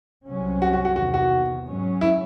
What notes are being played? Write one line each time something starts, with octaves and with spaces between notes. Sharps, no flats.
C2 C3 F#3 C#4
F#4
F#4
F#4
E2 C3 D#3 F#4
F#4
G#2 F#3 C#4
E4